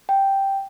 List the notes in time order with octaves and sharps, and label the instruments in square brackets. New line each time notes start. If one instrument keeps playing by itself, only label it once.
[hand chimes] G5